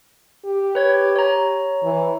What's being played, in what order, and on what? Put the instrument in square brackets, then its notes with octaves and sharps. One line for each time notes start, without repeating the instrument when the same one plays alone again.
[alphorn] G4
[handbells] B4 C#5 G#6
C#5 A#5
[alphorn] E3